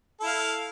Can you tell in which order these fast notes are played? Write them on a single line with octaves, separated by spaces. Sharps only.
A4 E4 F5